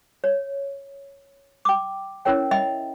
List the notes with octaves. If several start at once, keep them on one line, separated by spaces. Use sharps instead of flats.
C#5
G5 D6
C#4 E4 A#4 C#5 G5
D#5 E5 G5 B5